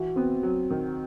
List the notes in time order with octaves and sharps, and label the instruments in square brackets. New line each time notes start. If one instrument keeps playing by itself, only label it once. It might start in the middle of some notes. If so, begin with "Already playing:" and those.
Already playing: [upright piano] E3 [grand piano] F#4
[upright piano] B3 [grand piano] C4
[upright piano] F#3
D#3